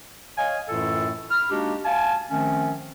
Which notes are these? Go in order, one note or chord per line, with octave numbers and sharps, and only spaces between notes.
C#5 D#5 F5 G#5
F#2 A2 E3 A3 F4 A4
B5 F6
G#3 A#3 D4 D#4 F#4 G4
F5 G#5 A5
D#3 F3 A3 C4 C#4